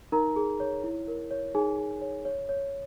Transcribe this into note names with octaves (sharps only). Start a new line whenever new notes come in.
D#4 A#4 A#5
G#4
C#5
E4
A#4
C#5
D#4 G#4 G#5
G#4
C#5
C#5
C#5